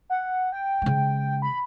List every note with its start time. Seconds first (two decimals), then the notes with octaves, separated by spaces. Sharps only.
0.10 F#5
0.52 G5
0.82 C#3 G#3
1.42 B5